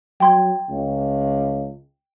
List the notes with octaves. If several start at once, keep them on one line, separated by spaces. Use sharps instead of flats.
F#3 G5 C6 G#6
C#2